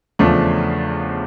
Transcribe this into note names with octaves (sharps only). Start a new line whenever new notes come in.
E2 C#3 F3 A3 D4